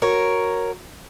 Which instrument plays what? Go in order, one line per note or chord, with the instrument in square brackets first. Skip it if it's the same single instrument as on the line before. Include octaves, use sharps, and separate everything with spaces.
[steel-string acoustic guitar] F#4 A#4 C#5